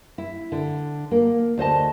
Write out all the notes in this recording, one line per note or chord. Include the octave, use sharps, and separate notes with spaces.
E4
D3
A#3
D2 C5 D#5 A5